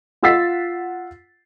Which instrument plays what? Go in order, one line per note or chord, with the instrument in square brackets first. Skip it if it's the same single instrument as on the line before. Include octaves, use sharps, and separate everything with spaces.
[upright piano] F4 F#5 E6 A6 B6 C7